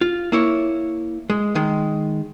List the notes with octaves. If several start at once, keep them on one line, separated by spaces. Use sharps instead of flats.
F4
A#3 E4 C#5
G#3
D#3 G#3